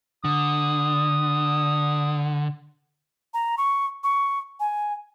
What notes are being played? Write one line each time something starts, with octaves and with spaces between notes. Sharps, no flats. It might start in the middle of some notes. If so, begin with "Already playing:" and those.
D3 D#6
A#5
C#6
C#6
G#5